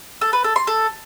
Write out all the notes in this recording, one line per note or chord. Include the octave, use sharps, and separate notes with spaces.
A4
B4
A4
C6
A4